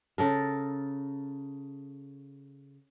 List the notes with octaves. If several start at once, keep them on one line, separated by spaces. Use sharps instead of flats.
C#3 A4 A#4